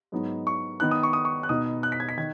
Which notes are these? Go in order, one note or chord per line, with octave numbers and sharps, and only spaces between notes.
G#2 F#3 B3 D#4
C#6
D#3 B3 D#4 F#6
D#6
C#6
D#6
C#6
F#6
B2 B3 D#4 D#6
F#6
B6
G#6
B6
D#3 G#6